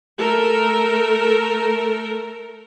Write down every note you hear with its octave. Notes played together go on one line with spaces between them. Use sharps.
A3 A4 A#4